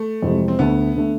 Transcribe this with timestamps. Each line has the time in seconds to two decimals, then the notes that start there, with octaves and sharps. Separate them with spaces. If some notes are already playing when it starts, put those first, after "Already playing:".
Already playing: A3
0.22 F2 C3 E3 G#3
0.48 C4
0.59 D2 D3 A3 B3
0.96 D3 A3